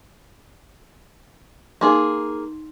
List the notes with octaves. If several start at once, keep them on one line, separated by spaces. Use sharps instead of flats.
A#3 D#4 G#4 C6